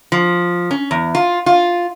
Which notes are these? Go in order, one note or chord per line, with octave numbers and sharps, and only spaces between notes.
F3
C#4
E2
F4
F4